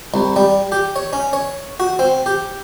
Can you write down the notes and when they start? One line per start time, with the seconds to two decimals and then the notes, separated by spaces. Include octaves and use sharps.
0.14 C2
0.36 G3
0.72 G4
0.96 C#5
1.13 C#4
1.33 C#5
1.80 F#4
1.99 C4
2.26 G4